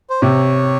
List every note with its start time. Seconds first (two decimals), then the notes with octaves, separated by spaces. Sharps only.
0.10 C5
0.22 C3 C#5